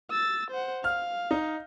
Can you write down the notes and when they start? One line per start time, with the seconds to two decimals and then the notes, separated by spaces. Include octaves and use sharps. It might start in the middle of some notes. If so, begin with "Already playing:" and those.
0.11 E6 A6
0.51 C5 F#5
0.84 F5 F6
1.31 D#4